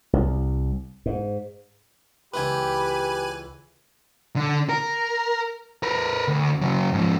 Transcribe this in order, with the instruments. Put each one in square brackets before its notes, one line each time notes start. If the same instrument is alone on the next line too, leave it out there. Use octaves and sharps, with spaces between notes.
[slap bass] C2
G#2
[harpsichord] C#2 E3 C5 [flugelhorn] G4 [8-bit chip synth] B4 G#5 [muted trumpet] B5
[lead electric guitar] D3
A#4
A#4 B4
D2
C#3 F#3
G#2 F3